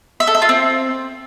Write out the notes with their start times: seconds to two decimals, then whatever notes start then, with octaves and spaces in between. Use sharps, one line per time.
0.20 E5
0.27 A4
0.35 E5
0.42 F4
0.49 C4